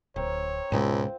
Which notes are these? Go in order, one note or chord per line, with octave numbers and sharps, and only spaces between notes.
D1 C4 A#4 C#5
C#2 G#2 B2 G#3 C4 F4